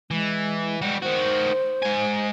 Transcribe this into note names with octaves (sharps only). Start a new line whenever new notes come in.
E3 G#3
G3 G#3 F#4
D#3 F#4 C5
G#2 G#5